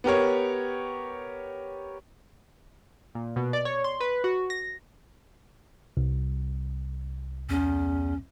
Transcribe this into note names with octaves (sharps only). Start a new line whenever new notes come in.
B3 G4 A#4 C#5
A#2
B2
D5
C#5
C6
B4
F#4
A#6
C2
E2 C#4